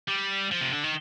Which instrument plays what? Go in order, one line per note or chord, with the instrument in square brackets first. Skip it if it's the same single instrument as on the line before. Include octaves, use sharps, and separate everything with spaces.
[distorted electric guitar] G3
F3
C3
D3
D#3